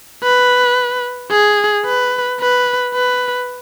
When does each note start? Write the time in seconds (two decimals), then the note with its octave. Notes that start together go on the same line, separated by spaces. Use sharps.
0.24 B4
1.31 G#4
1.86 B4
2.40 B4
2.94 B4